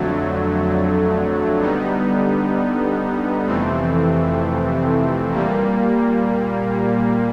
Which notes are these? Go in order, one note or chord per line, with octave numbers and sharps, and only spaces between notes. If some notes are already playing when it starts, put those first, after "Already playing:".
Already playing: F2 D3 F#3 A3
D3 G3 B3 D#4
F2 C3 E3 A3 C4
A#2 G3 A#3